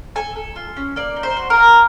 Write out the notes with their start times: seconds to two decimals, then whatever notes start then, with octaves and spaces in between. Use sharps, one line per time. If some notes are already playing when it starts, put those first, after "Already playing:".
0.16 A4 G#5
0.36 A4
0.56 F4
0.77 C#4
0.96 A#3 D5
1.16 D#4
1.23 C5
1.37 F#4
1.50 A#4
1.56 A#3